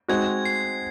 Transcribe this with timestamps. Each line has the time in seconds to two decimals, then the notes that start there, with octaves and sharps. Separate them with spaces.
0.08 G#3 C4 D#4 F#4 G#6
0.45 C7